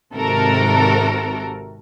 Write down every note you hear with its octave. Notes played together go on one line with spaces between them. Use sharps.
G#1 C3 F#4 A4 A#4